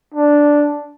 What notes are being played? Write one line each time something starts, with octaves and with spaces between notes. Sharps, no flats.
D4